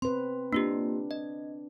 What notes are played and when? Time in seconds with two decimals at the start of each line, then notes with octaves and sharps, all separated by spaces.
0.02 C4 B4 C6
0.53 A#3 D4 F4 G4
1.11 D#5